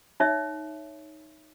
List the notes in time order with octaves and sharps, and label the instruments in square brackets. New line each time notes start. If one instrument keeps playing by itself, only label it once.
[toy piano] D#4 C#5 E5